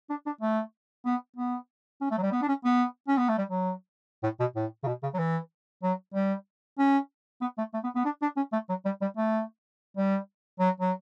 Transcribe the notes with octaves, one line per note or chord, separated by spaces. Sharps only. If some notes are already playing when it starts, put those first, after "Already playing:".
D4
D4
A3
B3
B3
C#4
A3
F#3
G3
B3
D4
C#4
B3
C#4
B3
A3
G3
F#3
A2
B2
A2
C#3
B2
C#3
F#3
E3
F#3
G3
C#4
B3
A3
A3
B3
B3
D4
D4
C#4
A3
F#3
G3
G3
A3
G3
F#3
F#3